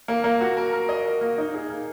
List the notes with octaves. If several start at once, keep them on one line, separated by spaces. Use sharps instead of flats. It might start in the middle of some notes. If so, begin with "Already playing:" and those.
A#3
A#3
F#4
A#4
A#4
D#5
A#4
A#3
D#4
G#4
A#3